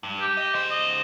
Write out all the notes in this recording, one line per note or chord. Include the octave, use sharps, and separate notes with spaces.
G2
G4
D#5
C#3 C5
D#5